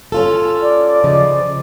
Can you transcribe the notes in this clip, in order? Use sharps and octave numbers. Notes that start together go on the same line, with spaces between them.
C#4 F4 A4
D5
C#3 F3 D#5